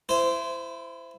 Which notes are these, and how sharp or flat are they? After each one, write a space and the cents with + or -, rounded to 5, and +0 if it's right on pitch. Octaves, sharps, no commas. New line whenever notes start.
E4 +20 C5 -15